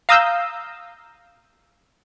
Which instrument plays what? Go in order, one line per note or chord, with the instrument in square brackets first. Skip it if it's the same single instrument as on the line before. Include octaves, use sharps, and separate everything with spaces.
[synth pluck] F5 A#5 D#6 E6 G6